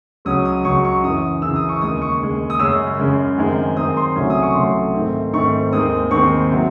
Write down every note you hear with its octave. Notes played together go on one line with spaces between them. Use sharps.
C#2 C#3 F#3 C#4 D#6
D#6
C#2 C#3 F#3 C#4 C#6
C#6
F#2 C#3 E3 D#6
F#2 C#3 E3 E6
D#6
C#6
D#2 C#3 G#3 D#6
C#6
D#2 C#3 G#3
D#6
F#2 C#3 G#3 C#4 E6
F#2 C#3 G#3 C#4
F#2 D#3 G#3 C4
F#2 D#3 G#3 C4 D#6
C6
C2 C3 F#3 A3 C#4 G#5
D#6
C#6
C2 C3 F#3 A3 C#4 C6
G#2 D#3 A3 C4
G#2 D#3 A3 C4 C#6
D#2 D#3 G#3 C4 D#6
D#2 D#3 G#3 C4 C#6
C3 F#3 C4